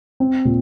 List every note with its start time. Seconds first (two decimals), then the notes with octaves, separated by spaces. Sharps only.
0.20 C4
0.45 A#2